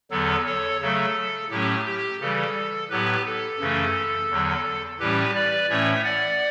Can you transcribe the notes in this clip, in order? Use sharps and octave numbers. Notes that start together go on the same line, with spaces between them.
E2 D3 F#3 B3 A4
A4 C#5
C#3 F#3 A3 A4
A2 F#3 A3 C#4 G4
G4
C#3 E3 G3 A4
A2 F#3 B3 G4 B4
A4
F#2 C#3 E3 A3 C#4
E2 D3 F#3
A2 E3 G3 C#4 G4 B4
B4 D5
A2 E3 A3 C#4 C#5 E5
D5 F#5